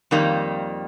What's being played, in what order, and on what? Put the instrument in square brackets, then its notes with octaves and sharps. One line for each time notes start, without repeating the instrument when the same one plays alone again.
[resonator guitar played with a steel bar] F2 D#3 G3 A#3